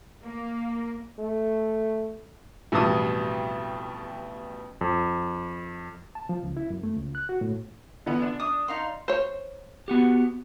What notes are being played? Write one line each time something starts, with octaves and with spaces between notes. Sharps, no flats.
A#3
A3
A1 F2 B2 G3 A5 D#6
F2
A5
F3
C#2
E4
F#2
A3
C#2
F#6
F#4
A2
D3 E3 B3
D4
D4 D#6
D#4 F5 C6
C5 C#5
B3 F#4 G4